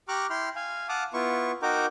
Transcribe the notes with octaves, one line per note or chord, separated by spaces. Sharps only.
G4 A#5 C#6 D6 F6 F#6
E4 G5 C6 F6
F5 G#5
F5 F#5 A5 D6 D#6
B3 E4 F4 C#6
D#4 F#4 A#4 G5 A#5 D6